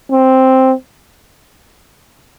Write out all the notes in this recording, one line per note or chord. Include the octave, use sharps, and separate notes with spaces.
C4